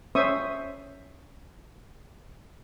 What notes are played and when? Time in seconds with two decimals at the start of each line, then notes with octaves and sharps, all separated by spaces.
0.15 C#4 C5 E5 C#6 D#6